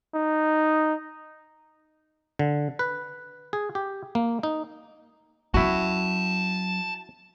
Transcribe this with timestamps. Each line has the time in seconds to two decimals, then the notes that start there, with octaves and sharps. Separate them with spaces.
0.15 D#4
2.39 D3
2.79 B4
3.53 G#4
3.75 G4
4.15 A#3
4.43 D#4
5.54 F#3 C#4 E4 F#4 G5 A5